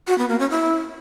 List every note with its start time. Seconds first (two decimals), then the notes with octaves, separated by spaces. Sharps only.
0.08 F#4
0.18 B3
0.29 A#3
0.39 C#4
0.50 E4